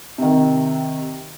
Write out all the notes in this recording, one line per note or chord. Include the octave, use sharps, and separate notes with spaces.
C3 D#3